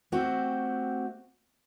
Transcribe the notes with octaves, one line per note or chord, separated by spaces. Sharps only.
A3 C4 F#4 G4